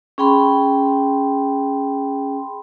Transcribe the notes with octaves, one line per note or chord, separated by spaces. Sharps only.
C#4 G#4 G5 B5 C6